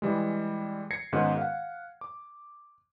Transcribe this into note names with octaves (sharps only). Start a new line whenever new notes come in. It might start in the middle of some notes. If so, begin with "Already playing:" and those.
E3 G3 G#3
G#6 A#6 C7 C#7
G#2 D#3 G#3 B3 C#4 F#4
F5 F#5
D6